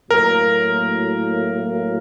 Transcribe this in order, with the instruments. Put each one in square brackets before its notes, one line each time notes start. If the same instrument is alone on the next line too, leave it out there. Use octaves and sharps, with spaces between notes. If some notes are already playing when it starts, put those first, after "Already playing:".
[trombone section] A2 F#3 A#3 [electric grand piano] A#4